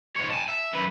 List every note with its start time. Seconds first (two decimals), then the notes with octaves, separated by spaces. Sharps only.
0.16 G#2 C#5
0.31 G#5 A5
0.49 E5
0.73 F#2 B4